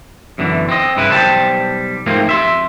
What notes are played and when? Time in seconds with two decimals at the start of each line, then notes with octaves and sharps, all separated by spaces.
0.38 F#2 B2 D3 E3
0.69 C4 D#5
0.97 G2 C#3 E4 B4
1.11 B1 G3 C5 G5 A5
2.06 G#2 F3 A3 A#3 C4
2.27 F2 E5 C6